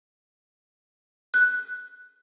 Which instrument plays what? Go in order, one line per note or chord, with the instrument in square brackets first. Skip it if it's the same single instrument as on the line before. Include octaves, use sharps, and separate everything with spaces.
[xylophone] F#6